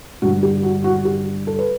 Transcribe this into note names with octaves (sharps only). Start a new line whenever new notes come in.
G2 D3 F#4
G4
F#4
F#4
G4
A4
B4